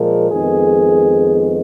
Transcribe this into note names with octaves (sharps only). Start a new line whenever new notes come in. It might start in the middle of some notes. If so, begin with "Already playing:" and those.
Already playing: A#2 F3 G#3 A#4
F2 D#3 G#3 B3 G#4